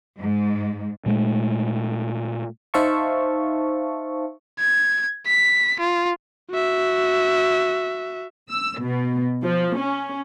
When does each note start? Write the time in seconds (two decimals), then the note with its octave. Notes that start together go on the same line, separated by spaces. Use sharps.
0.19 G#2
1.06 A#2 G#3 A3
2.74 D#4 C5 E5 F5 A5 C#6
4.59 G#6
5.26 B6
5.79 F4
6.50 F#4 E5
8.48 E6
8.80 B2
9.44 F3
9.76 C#4